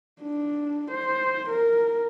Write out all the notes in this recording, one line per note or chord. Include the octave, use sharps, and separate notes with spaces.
D4
C5
A#4